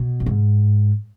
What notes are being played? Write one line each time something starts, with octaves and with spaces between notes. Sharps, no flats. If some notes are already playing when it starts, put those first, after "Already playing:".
Already playing: B2
F#2
G#2